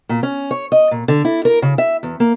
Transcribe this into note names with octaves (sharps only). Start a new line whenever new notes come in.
A#2
C#4
C#5
D#5
A#2
D3
E4
A#4
C#3
E5
E2
A#3